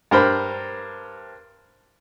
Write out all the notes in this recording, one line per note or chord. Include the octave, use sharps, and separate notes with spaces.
G2 A#4 C5 B5